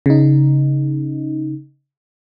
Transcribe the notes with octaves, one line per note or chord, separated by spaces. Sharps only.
C#3 D#4